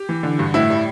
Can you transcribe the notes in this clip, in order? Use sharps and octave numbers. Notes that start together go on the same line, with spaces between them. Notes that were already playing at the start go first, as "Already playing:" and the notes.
Already playing: G4
E3
D3
G2
A2 E4
G3